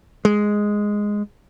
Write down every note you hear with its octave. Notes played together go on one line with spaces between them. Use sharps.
G#3